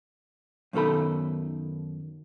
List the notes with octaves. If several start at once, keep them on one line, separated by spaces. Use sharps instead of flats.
F#2 B2 D#3 A4 B5